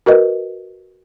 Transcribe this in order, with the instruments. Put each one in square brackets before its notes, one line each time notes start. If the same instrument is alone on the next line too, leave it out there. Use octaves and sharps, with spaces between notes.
[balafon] F#4 A#4 B4 D#5